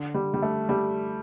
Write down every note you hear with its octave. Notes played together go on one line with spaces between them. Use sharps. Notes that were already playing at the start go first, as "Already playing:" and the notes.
Already playing: D3
G3
G3
A3
G3